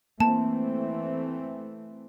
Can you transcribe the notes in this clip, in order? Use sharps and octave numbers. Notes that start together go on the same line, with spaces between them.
E3 A3 A#3 C4 A5